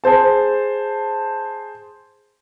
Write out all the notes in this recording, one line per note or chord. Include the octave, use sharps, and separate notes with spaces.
G#4 C5 A5